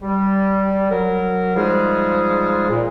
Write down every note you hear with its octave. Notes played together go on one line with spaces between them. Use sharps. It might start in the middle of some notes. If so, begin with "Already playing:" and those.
G3
F#3 A#4
G#2 F3 G3 G#3 G#4
A#2